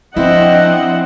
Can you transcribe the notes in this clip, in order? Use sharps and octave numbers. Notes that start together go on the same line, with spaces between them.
F3 C4 D4 E4 D#5 F#5